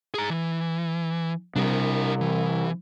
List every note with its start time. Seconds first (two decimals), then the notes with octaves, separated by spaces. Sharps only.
0.14 G#4 A#5
0.30 E3
1.56 C3 G3 D4 A#4
2.21 E3